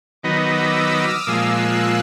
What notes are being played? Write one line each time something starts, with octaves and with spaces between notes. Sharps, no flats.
D#3 F#3 B3 D#4 D6 E6
D#6 F6
A#2 F3 G#3 E6 F#6